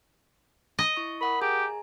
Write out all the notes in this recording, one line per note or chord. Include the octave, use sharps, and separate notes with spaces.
D#5
E4 C#6
A#4 F#5 B5 D#6
G4 G#4 G#5 A#5